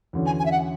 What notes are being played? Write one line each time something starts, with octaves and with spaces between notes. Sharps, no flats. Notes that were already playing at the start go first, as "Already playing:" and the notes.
E2 D3 F#3 C#4
G#5
G#5
E5
F#5